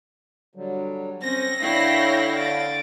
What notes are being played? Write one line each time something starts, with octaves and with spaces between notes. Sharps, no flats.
D3 F#3 G3
C4 C#4 C5 A#6
D3 E4 C#5 F5 G5 B5 C7
A6 D7